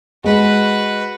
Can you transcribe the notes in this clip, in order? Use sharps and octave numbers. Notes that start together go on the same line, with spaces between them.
G#3 F#4 B4